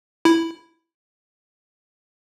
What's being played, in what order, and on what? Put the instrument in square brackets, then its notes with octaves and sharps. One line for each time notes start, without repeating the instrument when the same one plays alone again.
[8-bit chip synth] E4